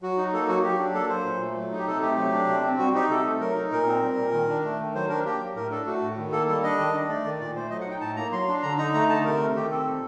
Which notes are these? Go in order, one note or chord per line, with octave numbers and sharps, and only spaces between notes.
F#3 F#4
D#4
A#3 A4
F#3 F#4
F#3 G4
D4
A#3 A4
F#3 C5
A#2
A3
F#3
D#4
G4
C3 A4
A3 G4
F#3
D4
C3
C4
G3 F#4
D#4 G4
C3 A4
A3
F#3 A#4
D#4
A#2 A#4
C4
G3
A#2
D#3
D4
A3
D#3
F#3 C5
D4 A#4
A#3 G4
F#3
A2 A#4
D4 A4
A3 F#4
A2
D#3
A#3 A4
G3 A4
D4 D#5
D#3
D4
A3 D5
D#3
A#2 D5
A3 C5
F#3 D#5
F#5
D#4 G5
A2 A5
A#3 A#5
F#3 C6
D4
D3 A#5
D#4 A#5
A3 A#5
D3 A5
C3 A#4
A3
D#3 G4
C4 A4
A#2